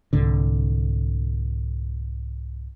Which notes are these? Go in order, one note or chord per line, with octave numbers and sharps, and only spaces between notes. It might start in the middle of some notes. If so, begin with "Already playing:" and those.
C2 G#2 D3